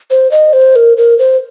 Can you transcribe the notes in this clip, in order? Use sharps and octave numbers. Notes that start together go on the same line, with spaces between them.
C5
D#5
C5
A#4
A#4
C5